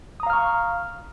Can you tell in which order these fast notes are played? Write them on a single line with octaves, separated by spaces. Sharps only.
D#6 A#5 F5 F6 C#6